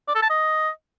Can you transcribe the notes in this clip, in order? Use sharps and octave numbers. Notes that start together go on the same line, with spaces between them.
D5
A4
A5
D#5